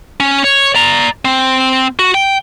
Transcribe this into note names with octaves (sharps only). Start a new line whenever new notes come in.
C#4
C#5
D5 A#5
C4
F#4
G5